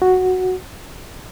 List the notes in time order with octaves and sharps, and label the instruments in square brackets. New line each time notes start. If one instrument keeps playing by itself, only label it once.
[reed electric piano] F#4